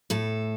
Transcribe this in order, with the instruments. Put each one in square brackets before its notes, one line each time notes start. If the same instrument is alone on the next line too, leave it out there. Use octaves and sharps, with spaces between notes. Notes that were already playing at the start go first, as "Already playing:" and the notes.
[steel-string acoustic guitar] A2 A4